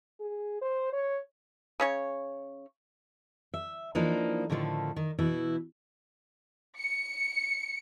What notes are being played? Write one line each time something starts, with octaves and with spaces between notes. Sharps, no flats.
G#4
C5
C#5
C#3 C#4 C#5
E5
E3 F3 A#3 D4 D#4
A2 D3 D#3 F3 A3
D#3
B2 E3 E4
C#7